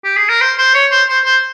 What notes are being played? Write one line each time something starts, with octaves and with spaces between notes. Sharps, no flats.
G4
G#4
A#4
C5
C5
C#5
C5
C5
C5